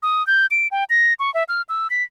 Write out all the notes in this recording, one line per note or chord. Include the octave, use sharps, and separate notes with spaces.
D#6
G6
D7
G5
A#6
C#6
E5
F6
E6
B6